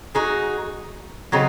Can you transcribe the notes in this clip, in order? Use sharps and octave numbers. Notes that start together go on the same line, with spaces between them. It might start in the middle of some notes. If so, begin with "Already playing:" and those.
G#3 D#4 F#4
C#3 F#3 C4 D#4